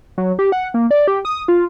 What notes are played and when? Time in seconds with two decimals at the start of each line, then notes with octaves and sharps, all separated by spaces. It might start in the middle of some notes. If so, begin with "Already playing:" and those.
0.18 F#3
0.39 G4
0.52 F#5
0.74 A#3
0.91 D5
1.08 G4
1.25 D#6
1.48 F4